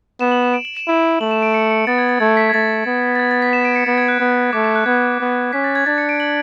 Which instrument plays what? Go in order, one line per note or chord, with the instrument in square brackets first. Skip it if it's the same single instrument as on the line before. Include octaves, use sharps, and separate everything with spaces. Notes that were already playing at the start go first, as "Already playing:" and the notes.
[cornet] B3 [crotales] E7
[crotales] F#7
E7
D7
F#7
E7
[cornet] E4
[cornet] A3 [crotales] F#7
[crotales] E7
D7
C#7
C#7
[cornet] B3 [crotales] A6
[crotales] G#6
A6
[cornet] A3 [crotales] G#6
[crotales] B6
G#6
[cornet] A3 [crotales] A6
[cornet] B3
[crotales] A6
G#6
A6
B6
E7
D7
C#7
[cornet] B3 [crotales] A6
[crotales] G#6
F#6
[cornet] B3
[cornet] A3 [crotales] D6
[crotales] D6
F#6
[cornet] B3 [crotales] G#6
[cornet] B3
[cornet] C#4 [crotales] B6
[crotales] A6
G#6
[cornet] D4 [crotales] A6
[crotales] C#7
D7
F#7